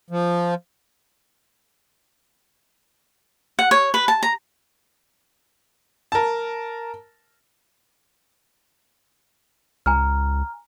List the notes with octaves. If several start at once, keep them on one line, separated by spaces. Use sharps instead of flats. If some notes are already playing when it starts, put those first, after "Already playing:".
F3
F#5
C#5
B4
A5
A#5
A#4 A5
C#2 G#5 A#5 F6